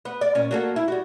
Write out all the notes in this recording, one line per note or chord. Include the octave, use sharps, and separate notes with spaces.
B3
D5
A#2 C#4
F#3 A#3 A4
E4
G3 F#4